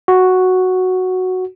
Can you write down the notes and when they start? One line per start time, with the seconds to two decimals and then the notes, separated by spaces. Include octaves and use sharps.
0.08 F#4